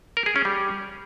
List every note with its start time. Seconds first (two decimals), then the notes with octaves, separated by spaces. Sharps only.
0.17 A#4
0.26 G#4
0.36 C#4
0.45 G3